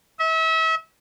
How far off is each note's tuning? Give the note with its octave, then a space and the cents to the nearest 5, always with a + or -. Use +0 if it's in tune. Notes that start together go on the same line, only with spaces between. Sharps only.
E5 -35